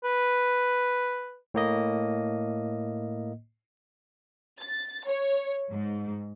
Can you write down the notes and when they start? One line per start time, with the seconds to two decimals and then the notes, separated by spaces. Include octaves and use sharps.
0.04 B4
1.54 A2 A#3 D#5
4.60 A6
5.06 C#5
5.71 G#2